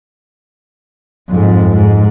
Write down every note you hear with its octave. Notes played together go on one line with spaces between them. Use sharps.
F2 G#2
G#2